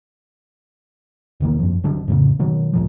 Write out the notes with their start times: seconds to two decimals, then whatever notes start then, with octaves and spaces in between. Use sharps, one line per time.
1.40 E1 C2 D#3 A#3
1.59 F#2 F3
1.83 C2 D3 F#3 D4
2.08 F2 A2 C#3
2.39 B2 D#3 F#3
2.73 C#2 A#2 F3